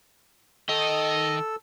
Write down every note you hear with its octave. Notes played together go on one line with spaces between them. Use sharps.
D#3 A4 D#5 E6